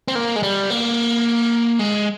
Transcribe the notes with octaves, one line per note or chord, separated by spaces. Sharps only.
C4
A#3
G#3
G3
A#3
G#3